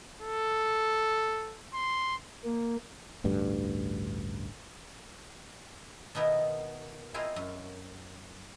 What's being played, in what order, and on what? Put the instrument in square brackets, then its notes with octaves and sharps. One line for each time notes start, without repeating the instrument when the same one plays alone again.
[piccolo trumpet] A4
C6
[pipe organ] A#3
[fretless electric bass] A1 D2 G2
[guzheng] B2 D#3 B3 D#4 E4 A#4
C4 E4 F4 G#4 A#4 D#5
F#2